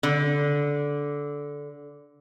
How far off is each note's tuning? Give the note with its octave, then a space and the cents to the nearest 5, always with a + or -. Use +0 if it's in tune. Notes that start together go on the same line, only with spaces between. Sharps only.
D3 -15